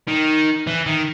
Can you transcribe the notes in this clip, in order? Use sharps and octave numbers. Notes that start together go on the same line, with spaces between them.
D#3
E3
D#3